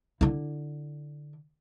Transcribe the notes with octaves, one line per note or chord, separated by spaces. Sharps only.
D3 E4